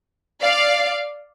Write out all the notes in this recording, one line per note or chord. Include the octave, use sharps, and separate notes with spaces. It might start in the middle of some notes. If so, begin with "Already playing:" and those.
D5 F5